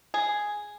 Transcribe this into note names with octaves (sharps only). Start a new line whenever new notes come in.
G#4